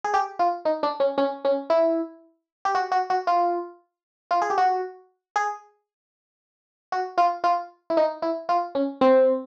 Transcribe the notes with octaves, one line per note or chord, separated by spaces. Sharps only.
G#4
G4
F4
D#4
D4
C#4
C#4
C#4
E4
G4
F#4
F#4
F#4
F4
F4
G#4
G4
F#4
G#4
F#4
F4
F4
E4
D#4
E4
F4
C#4
C4